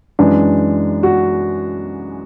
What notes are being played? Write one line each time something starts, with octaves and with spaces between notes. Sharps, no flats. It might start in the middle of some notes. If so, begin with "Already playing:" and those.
F#2 E3 G#3 D4
F#4